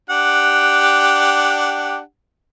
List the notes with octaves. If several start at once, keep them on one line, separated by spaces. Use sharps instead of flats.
D4 G4 F#5